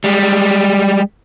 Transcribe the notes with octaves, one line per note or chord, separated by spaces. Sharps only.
G3 G#3